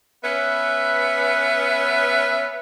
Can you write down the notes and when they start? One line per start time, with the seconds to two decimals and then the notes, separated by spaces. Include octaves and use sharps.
0.24 B3 C#4 B4 E5